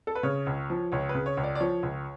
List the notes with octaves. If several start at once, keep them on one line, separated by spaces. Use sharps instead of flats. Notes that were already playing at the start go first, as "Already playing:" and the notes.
A4
B4
C#3 C#5
C#2
F3
C#2 C#5
B4
C#3
C#5
C#2
D5
D5
F3 C#5
C#2